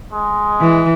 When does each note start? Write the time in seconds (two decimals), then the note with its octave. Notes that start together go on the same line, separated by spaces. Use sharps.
0.12 G#3
0.61 E3